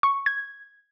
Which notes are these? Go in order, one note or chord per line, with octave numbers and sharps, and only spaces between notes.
C#6
G#6